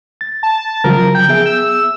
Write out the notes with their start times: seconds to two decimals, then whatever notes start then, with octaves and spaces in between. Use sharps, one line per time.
0.21 A6
0.43 A5
0.84 C#3 F3 F#3 A#4
1.15 G5
1.29 B3 G#4 E5 G5
1.46 E6